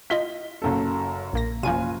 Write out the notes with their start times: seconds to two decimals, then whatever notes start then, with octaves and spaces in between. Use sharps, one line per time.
0.10 E4 F4 D#5 B6 G7
0.62 F#1 F#2 A4
1.33 A#1 A#3 A#6
1.63 F#1 F3 F4 G#5 D#7